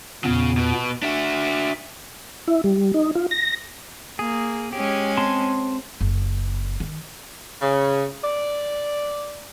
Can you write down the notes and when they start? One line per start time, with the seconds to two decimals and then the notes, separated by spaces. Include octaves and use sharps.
0.24 E2 A#2 C#3 B3
0.57 B2
1.02 D4 F#4 E5
2.48 E4
2.64 G3
2.94 D#4
3.15 F4
3.31 A#6
4.19 A#3 G#4
4.73 G#3 C#4 G4 G#4
5.17 C4 A5 C6
6.01 F#1
6.80 D#3
7.62 C#3
8.23 D5